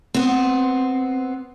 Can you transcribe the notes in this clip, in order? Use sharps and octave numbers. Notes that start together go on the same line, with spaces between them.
B3 C4